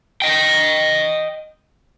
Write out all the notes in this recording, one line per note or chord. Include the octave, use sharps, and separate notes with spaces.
D#5 G5